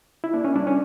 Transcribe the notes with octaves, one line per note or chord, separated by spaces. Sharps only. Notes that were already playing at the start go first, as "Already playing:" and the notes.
E4
A#3 D4
C#4
G3 D4
C#4